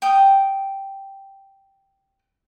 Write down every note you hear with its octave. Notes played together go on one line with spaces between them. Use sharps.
G5 D#6